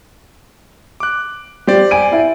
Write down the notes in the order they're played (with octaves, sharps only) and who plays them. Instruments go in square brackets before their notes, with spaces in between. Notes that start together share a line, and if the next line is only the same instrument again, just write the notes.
[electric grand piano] D6 F#6
[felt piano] G3 [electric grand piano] G4 C5 D5
[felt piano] G#5 D7 D#7
E4 E5